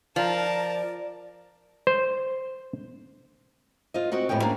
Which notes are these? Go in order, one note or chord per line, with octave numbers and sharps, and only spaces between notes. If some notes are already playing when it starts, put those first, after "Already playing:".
F3 A#4 D5 A5
C5
F4 C5 D#5
C4 F#4 D#5 F#5
F2 A2 G#3 B3 G5
A#3 C#4 D4 G#4